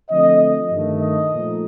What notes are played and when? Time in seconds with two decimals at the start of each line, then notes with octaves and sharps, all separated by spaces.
0.10 D3 F3 A3 C4 D#5
0.71 G2 D#3 A3
1.01 D#5
1.31 A#2 F3 A3 D#4